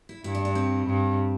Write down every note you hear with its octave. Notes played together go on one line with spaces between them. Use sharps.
E4
G2 E4
D4
D4
C4
G2